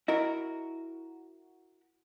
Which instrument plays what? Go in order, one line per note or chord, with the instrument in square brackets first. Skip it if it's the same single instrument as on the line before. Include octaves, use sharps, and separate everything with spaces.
[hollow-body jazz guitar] E4 F#4 A#4 [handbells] D#5